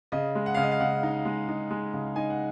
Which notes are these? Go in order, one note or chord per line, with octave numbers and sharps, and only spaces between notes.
C#3 D#5
G#3
F#5
C#3 F5
D#5
F5
C#3 F#5
D#4
G#3
D#4
G#3
C#3
D#4 G#5
F#5